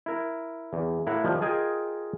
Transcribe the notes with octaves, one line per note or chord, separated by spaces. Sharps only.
E4 A#4
E2
A2 E4 A#4 F5 F#5
D#3 F3 G3
F4 G#4 A#4 D#5 G5 G#5